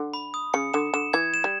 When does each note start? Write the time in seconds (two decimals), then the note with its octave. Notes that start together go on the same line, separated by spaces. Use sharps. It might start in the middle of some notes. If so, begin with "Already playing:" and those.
Already playing: D3
0.14 B5
0.34 D#6
0.54 C#3 C#7
0.74 D3 E7
0.94 D3 E7
1.13 E3 G#6
1.34 E7
1.44 G3